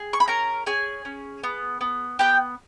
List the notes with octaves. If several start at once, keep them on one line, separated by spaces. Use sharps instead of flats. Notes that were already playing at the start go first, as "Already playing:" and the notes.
Already playing: G#4
C#6
B5
C#4 A#4 A#5
C#4 G#4 G#5
C#4
B3
B3
B3 G4 G5